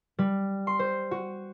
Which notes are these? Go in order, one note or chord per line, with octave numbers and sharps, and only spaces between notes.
G3
C6
C5
F#4